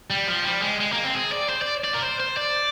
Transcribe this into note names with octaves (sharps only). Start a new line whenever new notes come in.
G3
F3
G3
G#3
G#3
A#3
C4
G#4
D5
C5
D5
D5
A#4
C5
C5
D5